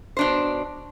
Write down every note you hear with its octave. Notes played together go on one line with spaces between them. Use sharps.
B2 D4 C5